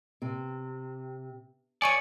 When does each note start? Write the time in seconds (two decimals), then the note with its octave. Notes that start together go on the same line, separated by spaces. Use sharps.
0.22 C3
1.82 C#5 D5 G#5 C#6 D#7